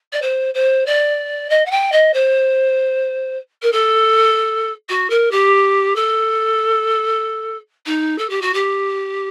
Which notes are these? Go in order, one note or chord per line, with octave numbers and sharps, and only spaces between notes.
D5
C5
C5
D5
D#5
F#5
G5
D#5
C5
A#4
A4
F#4
A#4
G4
A4
D#4
A4
G4
F#4
G4